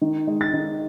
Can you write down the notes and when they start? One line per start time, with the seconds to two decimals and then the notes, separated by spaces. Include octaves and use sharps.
0.01 D#3
0.27 G#3
0.41 A6
0.53 D#3